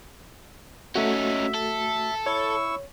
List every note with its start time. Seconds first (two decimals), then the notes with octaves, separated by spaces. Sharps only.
0.95 A3 C#4 D#4 F#4 E5
1.54 A4
2.26 E4 C#5 C#6 E6